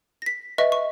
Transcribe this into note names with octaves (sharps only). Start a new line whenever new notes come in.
A#6 B6
B4 D#5 E5 C#6
C#6